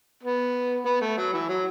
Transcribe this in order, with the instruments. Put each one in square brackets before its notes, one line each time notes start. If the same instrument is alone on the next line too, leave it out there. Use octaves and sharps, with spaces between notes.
[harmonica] B3
B3
A3
F#3
E3
F#3